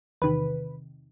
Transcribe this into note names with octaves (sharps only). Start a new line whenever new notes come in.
E2 C3 D#3 B4